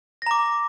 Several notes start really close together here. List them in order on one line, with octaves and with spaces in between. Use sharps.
A#6 A#5 D6